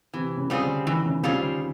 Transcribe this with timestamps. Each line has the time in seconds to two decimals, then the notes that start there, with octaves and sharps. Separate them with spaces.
0.13 C3 E3
0.37 C#3
0.50 C#3 G3 C4 F4 G#4
0.62 D3
0.86 D#3 E3
1.05 C#3
1.23 C#3 G3 C4 F4 G#4
1.41 D#3